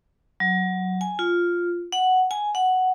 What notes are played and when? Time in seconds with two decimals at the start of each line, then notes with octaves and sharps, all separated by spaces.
0.40 F#3
1.01 G#5
1.19 F4
1.92 F#5
2.31 G#5
2.55 F#5